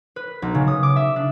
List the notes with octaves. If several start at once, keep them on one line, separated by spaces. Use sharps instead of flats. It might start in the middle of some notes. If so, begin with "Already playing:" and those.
B4
B1
C#3
D#6
D6
E5
D4